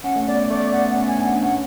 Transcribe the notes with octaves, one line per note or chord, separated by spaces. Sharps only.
C#4 F#5
A3
B3 D5
A3 D5
B3 F#5
F#5
C#4
G#5
D4
F#5
C#4 F#5